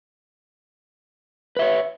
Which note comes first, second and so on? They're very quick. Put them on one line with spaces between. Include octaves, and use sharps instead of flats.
B4 E5 C#5